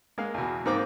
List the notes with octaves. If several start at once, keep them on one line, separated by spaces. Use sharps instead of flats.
G#3 A#3 F5
E2 B2
G#2 A#3 C4 D6